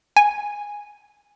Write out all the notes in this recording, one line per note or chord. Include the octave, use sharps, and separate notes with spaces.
G#5